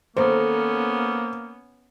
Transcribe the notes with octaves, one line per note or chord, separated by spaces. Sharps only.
D#3 A#3 B3 C#4 A4 A#4 C5